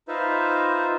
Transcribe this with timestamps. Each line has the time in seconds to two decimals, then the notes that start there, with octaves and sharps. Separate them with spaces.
0.08 D#4 F4 B4 C5 E5